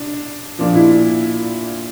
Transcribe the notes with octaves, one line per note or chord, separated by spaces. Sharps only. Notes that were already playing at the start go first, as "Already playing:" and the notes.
Already playing: D4
A#2 F3 D4
E4